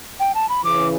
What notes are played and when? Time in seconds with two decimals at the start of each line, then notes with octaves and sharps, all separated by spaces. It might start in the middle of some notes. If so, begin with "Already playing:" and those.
0.20 G5
0.35 A5
0.49 B5
0.64 C#3 E3 D6